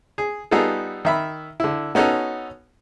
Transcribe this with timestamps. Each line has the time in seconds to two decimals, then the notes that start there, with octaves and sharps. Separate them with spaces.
0.18 G#4
0.51 G3 B3 D#4 F4 G#4 A4
1.05 D#3 E5 B5
1.60 D3 E4
1.95 B3 C#4 D#4 F#4 A4